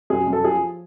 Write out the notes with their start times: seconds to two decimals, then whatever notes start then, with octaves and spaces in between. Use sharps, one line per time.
0.10 F#2 G#4
0.27 F#2
0.33 A4
0.44 F3 G#4